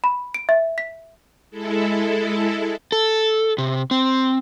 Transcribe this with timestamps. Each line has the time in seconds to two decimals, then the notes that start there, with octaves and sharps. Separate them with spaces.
0.04 B5
0.34 D7
0.49 E5
0.78 B6
1.51 G#3 E4 A4
2.92 A4
3.58 C3
3.91 C4